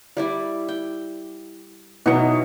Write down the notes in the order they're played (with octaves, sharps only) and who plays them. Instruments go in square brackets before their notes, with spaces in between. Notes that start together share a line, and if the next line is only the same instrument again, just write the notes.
[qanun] G3 E4 D5
G5
[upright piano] B2 D#4 C#7 [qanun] E3 F#3